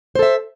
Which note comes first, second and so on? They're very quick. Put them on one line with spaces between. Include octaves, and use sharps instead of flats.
C5 A4 E5